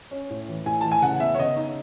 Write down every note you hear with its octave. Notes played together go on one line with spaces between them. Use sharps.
C#4
A2
E3
A2 G#5
E3 A5
G#5
C#3 F#5
B3 E5
C#5
C#3 D#5
D#4